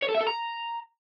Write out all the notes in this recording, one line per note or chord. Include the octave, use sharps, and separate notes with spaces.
C#5
A4
E5
A4
A#5